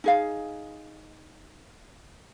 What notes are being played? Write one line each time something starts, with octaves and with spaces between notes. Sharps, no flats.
D#4 G#4 F5